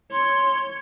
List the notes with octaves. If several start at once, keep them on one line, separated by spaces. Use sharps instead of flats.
C#5 C6